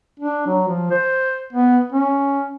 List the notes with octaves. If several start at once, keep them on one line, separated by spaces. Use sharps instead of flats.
D4
F#3
F3
C5
B3
C#4